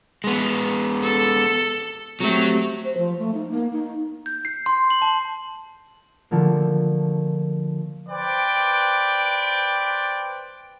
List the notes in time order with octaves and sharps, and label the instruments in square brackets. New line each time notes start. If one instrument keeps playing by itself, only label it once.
[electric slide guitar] G#3 B3
[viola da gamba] A4
[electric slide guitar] F#3 [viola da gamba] A3 C4 G4
[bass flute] C5
F3
A3
D#4
A#3
D#4
[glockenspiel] G6
C7
C6
F#7
A5
[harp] D3 F3 A3 A#3
[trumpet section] B4 C5 D5 G5